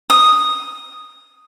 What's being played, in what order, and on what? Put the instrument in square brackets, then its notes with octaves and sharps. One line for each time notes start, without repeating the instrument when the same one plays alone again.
[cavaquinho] D#6